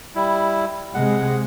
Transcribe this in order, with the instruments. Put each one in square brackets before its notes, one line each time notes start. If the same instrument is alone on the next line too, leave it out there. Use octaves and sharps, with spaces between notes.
[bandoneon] G3 E4
[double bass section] C3 G#3 [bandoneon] F#5